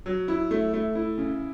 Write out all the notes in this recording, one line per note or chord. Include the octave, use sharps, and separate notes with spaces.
F#3
E4
A3
A3
E4
C#3